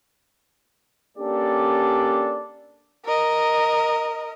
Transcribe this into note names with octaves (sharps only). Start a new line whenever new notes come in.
A#3 C#4 D4 G4 A4 D5
A#4 D#5